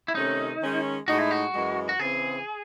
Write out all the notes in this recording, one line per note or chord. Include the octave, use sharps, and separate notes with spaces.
E4
C3 D#3 A3 C#4 D#4
D#3 G#3 C#4
A2 G#3 D#4 F#4
E4
F#4
F#2 E3 G#3
F#4
C#3 E3 C4 G#4